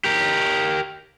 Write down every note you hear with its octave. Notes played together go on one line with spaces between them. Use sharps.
G4 A#4